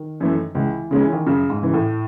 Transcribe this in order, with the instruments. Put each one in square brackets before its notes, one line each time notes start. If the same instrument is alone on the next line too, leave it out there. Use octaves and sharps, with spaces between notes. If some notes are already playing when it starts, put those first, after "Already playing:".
Already playing: [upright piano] D#3
[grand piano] F#2 E3 A3
[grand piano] C#2 [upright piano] E3
[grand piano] C#3 G#3 C#4
[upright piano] E3
D#3
[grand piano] F#2 [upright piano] C#3
[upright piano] G#2
[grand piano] C#3 E3
[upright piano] A2